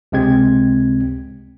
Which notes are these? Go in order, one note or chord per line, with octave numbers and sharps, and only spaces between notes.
C#2 C3 G#3 C4 G#6